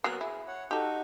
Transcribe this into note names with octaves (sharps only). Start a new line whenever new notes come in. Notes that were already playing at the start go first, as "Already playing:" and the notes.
F#3 A#3 B3 A#4 F#6
E4 G#4
C#5 F#5
D#4 F#4 G4 A4